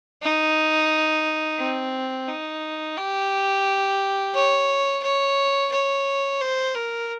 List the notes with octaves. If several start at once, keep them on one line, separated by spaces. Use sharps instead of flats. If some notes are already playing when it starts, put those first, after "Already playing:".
D#4
C4
D#4
G4
C#5
C#5
C#5
C5
A#4